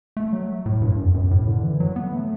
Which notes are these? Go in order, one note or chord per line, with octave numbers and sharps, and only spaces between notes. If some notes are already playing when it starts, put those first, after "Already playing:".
A3
F#3
A2
G2
F#2
E2
F#2
A2
D3
E3
F#3
B3
A3